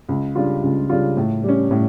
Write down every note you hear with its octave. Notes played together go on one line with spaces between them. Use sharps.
C#2
C#3 G3 D4 F4
C#2
C#3 G3 D4 F4
A2
G3 C#4
A2